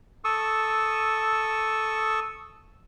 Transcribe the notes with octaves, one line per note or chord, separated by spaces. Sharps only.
A4 C#6 D#6 E6